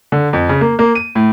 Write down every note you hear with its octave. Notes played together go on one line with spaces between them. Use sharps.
D3
F2
C#3
A#3
A#3
D#7
A2